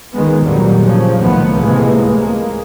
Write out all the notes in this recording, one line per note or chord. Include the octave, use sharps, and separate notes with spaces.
C#2 D#3 G#3 B3
F2 A#2 D#3 F#3 G3
C#3 F3
B1 A2 D#3 F3 B3
C#2 A2 C3 E3 G#3 A#3
G#3 A#3